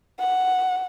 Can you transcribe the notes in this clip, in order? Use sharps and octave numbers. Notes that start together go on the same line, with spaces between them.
F#5